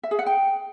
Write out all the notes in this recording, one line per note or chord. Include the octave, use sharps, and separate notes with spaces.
E5
G#4
F#5
G5